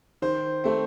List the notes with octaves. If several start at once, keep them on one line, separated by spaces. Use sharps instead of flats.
D#3 C5
A3 C4